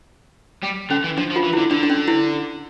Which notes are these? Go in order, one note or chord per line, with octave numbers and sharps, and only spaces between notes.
G3
D3 C#4
E3
F3 D4
F3
F4
E3
E4
D3
D3 D4
D4
C#4
E4